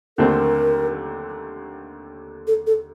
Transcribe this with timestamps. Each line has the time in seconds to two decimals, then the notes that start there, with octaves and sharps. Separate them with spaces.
0.18 D#2 D3 A3 C4 A#4
2.47 A4
2.67 A4